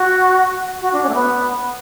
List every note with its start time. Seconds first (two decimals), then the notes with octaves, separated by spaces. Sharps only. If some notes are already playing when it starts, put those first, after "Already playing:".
Already playing: F#4
0.81 F#4
0.93 D4
1.03 C#4
1.09 A3
1.15 B3